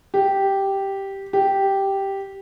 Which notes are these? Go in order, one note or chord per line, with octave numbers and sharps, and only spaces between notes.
G4
G4